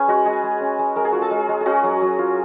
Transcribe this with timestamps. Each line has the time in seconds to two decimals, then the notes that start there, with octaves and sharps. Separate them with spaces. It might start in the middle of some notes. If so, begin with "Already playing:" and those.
Already playing: C#4 G#4 B4
0.08 G#3 F#4
0.26 G#3 G#4
0.44 G#3
0.61 C#4
0.79 G#3
0.96 G#3 A#4
1.05 G#4
1.12 F4 F#4
1.22 G#4
1.31 G#3
1.49 G#3
1.61 G#4
1.66 C#4 F#4
1.84 F#3
2.01 F#3
2.19 F4